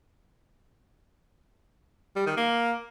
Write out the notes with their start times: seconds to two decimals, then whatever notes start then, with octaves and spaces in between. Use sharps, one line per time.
2.16 G3
2.27 D#3
2.37 A#3